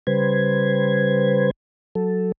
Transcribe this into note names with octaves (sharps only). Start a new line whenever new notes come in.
C#3 G3 B4 C5 G#6
F#3 A4